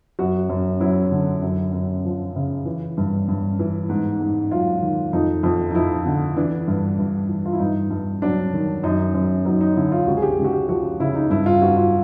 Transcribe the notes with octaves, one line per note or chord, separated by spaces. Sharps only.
F#2 F#4
F#2
F#3 E4
D3
F#2
F#2
F3
C#3
E3
G2
G2
E3
G#2
G#2
F#3 F4
D#3
F2 D#4
F2
D#4
F3 E4
D3
E3 D4
G2
G2
E3
F4
E4
G2 D#4
G2
F#3 D4
D#3
F#2 D#4
F#2
F#3 D#4
D#4
D3 E4
F4
C#2 F#4
G#4
G4
C#2
F#4
G4
F3 F#4
C#3 E4
D#4
G2 E4
F4
G2 F#4
F4